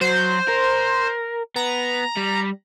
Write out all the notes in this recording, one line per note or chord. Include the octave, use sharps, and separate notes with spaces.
F#3 C5
A#4
B3 A#5
G3